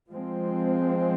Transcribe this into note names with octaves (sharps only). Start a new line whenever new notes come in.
F3 G#3 C4